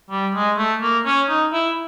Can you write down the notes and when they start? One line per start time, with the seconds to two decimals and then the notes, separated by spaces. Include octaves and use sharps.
0.10 G3
0.35 G#3
0.58 A3
0.82 A#3
1.06 C#4
1.29 D#4
1.53 E4